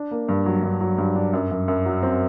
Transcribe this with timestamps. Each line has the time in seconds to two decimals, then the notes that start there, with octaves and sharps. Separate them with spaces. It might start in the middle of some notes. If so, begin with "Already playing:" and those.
Already playing: D4
0.11 A#3
0.29 G2
0.46 F#3
0.63 G2
0.80 F#3
0.98 G2
1.16 D4
1.33 F#2
1.51 F#2
1.68 F#2
1.86 F#3
2.03 C4